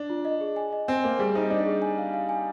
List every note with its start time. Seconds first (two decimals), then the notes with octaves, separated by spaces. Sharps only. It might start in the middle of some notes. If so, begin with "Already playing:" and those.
Already playing: D4
0.10 F4
0.25 D#5
0.41 G#4
0.56 G#5
0.72 D#5
0.88 C4 G#5
1.04 A#3 C5
1.19 G3 G#4
1.35 D#4 C5
1.50 D4 D#5
1.66 G#4
1.82 G#5
1.98 F5
2.14 F5
2.29 G#5